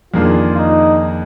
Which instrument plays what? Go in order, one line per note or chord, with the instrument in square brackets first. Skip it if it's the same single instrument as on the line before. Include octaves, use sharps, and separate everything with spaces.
[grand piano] F2 D#3 A#3 D4 G#4 [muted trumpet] F4
[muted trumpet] D#4